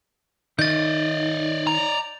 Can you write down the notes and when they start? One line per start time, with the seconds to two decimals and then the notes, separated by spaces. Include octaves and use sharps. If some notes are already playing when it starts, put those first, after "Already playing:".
0.59 D#3 D5 D#5 G6 A6
1.67 A#5